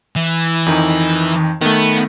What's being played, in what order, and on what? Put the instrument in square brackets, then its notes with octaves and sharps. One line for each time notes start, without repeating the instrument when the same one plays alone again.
[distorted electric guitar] E3
[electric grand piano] F2 D#3 D#4
[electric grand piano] D#3 A3 [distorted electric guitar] B3